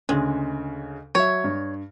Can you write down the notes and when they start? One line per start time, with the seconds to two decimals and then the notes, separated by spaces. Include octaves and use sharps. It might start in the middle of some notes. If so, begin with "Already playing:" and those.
0.09 D2 C#3 G#3
1.15 F#3 C#5 E5
1.44 G2